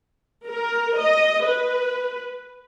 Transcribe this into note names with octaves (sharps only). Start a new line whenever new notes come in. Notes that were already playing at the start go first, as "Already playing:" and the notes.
A#4
D#5
B4